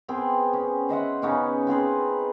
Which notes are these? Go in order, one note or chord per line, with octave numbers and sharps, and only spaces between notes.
B3 C4 G#4 G5
C#4
C5 D#5 E5 F#5
C#3 B3 C#4 D#4
C4 F4 G#4 B4